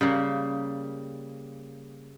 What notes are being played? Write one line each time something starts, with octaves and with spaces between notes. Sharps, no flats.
C#3 G3 A#3